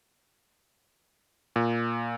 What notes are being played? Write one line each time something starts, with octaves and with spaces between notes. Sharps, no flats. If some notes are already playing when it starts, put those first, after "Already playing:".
A#2